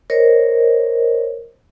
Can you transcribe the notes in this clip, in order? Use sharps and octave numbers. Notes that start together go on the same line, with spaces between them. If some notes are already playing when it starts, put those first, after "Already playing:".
A#4 C5 C#5 D#5